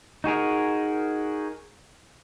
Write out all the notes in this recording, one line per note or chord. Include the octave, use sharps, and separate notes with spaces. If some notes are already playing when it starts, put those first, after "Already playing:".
D#4 F#4 G#4 A#4